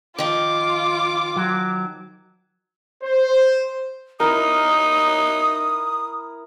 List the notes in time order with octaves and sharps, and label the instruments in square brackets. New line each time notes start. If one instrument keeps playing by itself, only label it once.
[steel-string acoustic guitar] D#3 F3 [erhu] F4 [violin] D6
[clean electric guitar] F#3
[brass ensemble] C5
[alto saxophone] D#4 [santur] E4 A#4 [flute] D#6